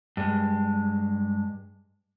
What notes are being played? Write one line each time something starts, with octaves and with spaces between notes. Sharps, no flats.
G2 G#3